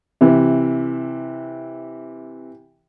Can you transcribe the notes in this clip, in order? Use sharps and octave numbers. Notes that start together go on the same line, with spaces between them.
C3 E3